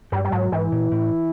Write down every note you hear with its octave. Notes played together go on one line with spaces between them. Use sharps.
G2 G3
G3
G#2 F#3
G#2 E3
A#2
A2